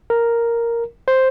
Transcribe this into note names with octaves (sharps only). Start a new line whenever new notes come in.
A#4
C5